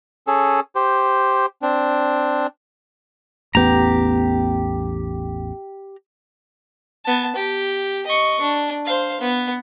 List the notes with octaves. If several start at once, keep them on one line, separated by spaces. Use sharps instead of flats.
C#4 G#4 A4
G4 C5
C4 D4
A1 E2 B3 G4 A#5
B3 A5
G4
D#5 C#6
D4
C5 F5
B3